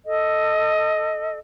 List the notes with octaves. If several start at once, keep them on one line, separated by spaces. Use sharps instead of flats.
A4 D#5